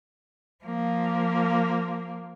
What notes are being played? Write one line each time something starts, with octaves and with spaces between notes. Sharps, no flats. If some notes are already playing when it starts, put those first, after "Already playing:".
F3 A#3